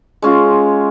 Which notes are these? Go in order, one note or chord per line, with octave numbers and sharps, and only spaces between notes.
G#3 C#4 F4